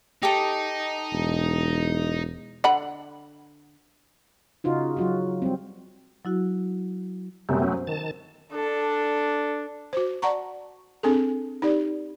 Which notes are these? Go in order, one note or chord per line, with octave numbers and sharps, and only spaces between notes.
D#4 G4 A4
E1
D3 F#5 B5
C#3 D#4 F4 F#4
F#3 F4 F#4
G3 C4
F#3 E4 F#4
F#2 C3 G3 A3 B3 C4
F#3 C#4
C5
D#3 A5
D4 A4
F#4 C5
D5 F#5 A5 A#5 C#6
C4 D4 G#4 A4
D#4 G4 D5